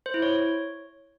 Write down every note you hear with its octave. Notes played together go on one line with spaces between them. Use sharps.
C5
E4
C#5